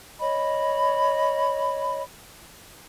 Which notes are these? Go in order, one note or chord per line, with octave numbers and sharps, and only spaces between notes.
C#5 D#5 B5